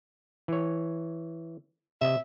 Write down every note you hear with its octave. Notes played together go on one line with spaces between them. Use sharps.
E3 C#5
C3 D#5 E5